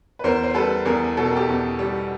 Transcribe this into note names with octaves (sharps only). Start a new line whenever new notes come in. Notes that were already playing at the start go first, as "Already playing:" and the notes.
B4
E2 A#4 C5
C5
G3 A4 B4
E2 G#4 A#4
B2 A4
A#4
G4 A4
E2
G3